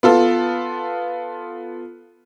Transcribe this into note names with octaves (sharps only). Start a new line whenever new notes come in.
B3 F4 A4